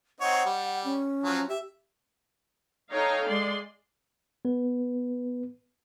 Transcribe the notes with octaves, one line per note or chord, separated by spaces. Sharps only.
C4 D#4 C#5 F#5
G3
C#4
F3 F#3
G4 E5
D#4 A4 C#5 F5 G5 A#5
G#3 D5 C6
B3 B4